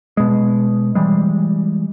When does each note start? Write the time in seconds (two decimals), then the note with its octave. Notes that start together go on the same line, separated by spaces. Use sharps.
0.17 B2 G#3
0.95 E3 G3 G#3